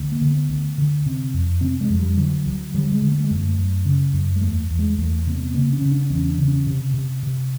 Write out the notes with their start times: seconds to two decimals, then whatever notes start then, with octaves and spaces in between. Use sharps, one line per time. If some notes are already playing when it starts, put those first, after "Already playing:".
Already playing: D2
0.12 A#3
0.21 D3
0.30 B3
0.49 D2
0.78 D3
1.06 C3
1.34 F2
1.61 C3 C4
1.81 G#3
1.90 F2
1.99 G3
2.17 D3 F#3
2.46 D2 F#3
2.74 D3 G3
2.92 G#3
3.02 D3
3.12 A3
3.24 G#3
3.30 F#2
3.36 A3
3.58 F#2
3.85 C#3
4.14 F#2
4.36 G#3
4.42 E2 A3
4.70 E2
4.79 G#3
4.98 E2 A3
5.27 C3 A#3
5.36 B3
5.54 C#3 A#3
5.73 C#4
5.81 C#3
5.91 D4
6.10 E2 C#4
6.29 D4
6.38 C#3
6.48 C#4
6.66 C3
6.94 C3
7.23 C3